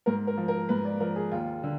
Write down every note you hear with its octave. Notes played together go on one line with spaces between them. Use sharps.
G#2 A#4
A#4
F3
A#4
G#2 B4
D5
F3 A#4
G#4
D#2 F4
D3